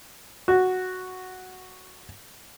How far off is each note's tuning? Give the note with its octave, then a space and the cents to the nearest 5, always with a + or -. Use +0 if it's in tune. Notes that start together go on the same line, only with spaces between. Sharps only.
F#4 +0